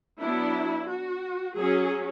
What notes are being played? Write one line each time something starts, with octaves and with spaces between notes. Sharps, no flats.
F#3 B3 D4 E4
F#4
F#3 C#4 G#4